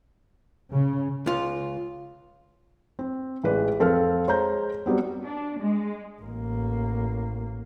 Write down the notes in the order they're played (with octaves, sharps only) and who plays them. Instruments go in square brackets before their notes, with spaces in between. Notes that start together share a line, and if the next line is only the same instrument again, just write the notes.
[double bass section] C#3
[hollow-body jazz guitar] C#2 F4
[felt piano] C4
A1 G#3 B4 D5
F2 C4 A4 F5 F6
G#3 C5 C#5 A#5 G6
F#3 G3 B3 C4
[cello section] D4
G#3
[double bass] A1 A#3